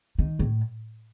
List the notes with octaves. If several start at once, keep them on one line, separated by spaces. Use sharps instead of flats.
D#3
A2